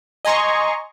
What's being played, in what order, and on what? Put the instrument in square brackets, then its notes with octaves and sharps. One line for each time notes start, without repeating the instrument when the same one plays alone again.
[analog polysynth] D#5 G#5 A#5 C6 C#6